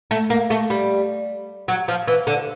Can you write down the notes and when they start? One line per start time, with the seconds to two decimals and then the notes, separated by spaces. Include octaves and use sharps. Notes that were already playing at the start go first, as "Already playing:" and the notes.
0.11 A3
0.30 A#3
0.50 A3
0.70 G3
1.68 F#3
1.88 F3
2.08 E3
2.27 D3